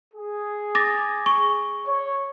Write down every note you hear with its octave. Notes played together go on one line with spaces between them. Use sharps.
G#4
D6 A6 A#6
C#6
C#5